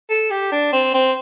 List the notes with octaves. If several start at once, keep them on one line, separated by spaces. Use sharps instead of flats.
A4
G4
D4
C4
C4